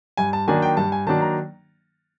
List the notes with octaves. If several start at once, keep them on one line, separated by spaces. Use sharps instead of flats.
G2 G#5
A5
D#3 F#3 A#3 D4 G#5
G5
G2 A5
G#5
D#3 F#3 A#3 D4 A5
A#5